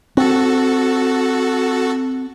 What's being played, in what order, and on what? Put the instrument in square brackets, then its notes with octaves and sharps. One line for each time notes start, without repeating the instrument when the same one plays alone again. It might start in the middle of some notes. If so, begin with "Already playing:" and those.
[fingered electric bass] C4 [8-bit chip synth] F#4 A4